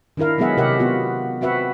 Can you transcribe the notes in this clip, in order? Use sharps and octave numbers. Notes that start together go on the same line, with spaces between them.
D#3 D4 E4 A#4 F5
F#3 G#3 B3 G#4 E5 F#5
C3 G4 A#4 E5 F#5
B3 F4 F#4
C4 F#4 B4 E5 F#5